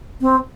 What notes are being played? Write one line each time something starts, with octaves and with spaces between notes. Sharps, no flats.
C4